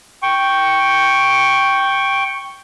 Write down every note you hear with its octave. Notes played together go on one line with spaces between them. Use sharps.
G5 C#6